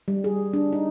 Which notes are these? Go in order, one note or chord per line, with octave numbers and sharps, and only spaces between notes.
G3
G#4
D4
D#4